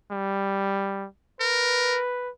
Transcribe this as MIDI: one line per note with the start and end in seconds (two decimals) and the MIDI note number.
0.12 1.07 55
1.40 1.99 70
1.40 2.30 71